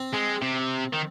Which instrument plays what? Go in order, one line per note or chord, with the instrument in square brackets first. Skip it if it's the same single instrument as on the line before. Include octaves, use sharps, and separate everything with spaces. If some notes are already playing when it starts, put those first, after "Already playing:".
Already playing: [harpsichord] C4
[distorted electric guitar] G#3
C3
D#3